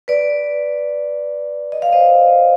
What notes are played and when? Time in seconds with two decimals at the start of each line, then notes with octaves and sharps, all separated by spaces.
0.08 B4 D5
1.72 D#5
1.82 F5
1.93 C5 D#5